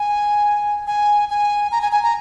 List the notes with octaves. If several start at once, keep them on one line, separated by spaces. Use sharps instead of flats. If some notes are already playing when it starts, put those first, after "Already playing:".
Already playing: G#5
G#5
G#5
A#5
G#5
G#5
A#5